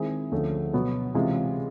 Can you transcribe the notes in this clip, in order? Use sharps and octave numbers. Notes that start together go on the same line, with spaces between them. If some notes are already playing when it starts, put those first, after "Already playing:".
Already playing: D#3 G#3 C4 E4 G#4
D2 D3 F3 A3 C#4
B2 F#3 B3
C3 E3 G#3 C#4 F4